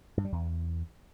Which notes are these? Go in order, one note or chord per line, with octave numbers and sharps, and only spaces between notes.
G2
G3
E2